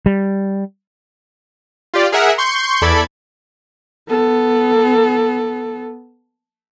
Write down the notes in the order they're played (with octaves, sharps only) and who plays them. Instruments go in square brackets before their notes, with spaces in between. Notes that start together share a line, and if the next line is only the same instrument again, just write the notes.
[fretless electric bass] G3
[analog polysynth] F4 G4 D5
G#4 A#4 E5 F#5
C6 C#6 G6
E2 A4 D5 B5 G#6
[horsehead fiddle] B3 A4